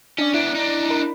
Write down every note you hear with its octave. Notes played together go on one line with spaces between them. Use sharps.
C#4 D4 D5
B3 D4 E4
D4 D#4
A#4 B5